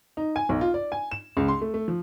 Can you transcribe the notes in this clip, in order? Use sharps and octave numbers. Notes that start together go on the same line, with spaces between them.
D#4
G#5
B1
F4
D5
G#5
E7
C#2
C6
A3
A3
F3